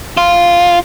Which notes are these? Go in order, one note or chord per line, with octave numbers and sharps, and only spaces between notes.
F4